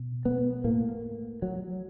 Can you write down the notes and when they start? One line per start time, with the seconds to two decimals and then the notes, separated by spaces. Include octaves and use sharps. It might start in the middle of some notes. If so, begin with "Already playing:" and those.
Already playing: B2
0.25 B3
0.64 A2 A#3
1.42 F#3